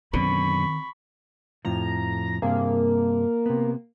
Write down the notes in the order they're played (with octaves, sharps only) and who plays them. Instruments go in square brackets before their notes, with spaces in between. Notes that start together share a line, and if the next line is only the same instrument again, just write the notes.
[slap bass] F#2 B2 D3 [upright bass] D#3 C4 [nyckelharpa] B5 C#6
[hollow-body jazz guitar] F2 A2 F3 [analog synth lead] A#5
[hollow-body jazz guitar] G2 C3 G#4 [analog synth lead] A#3
[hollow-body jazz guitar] C3 B3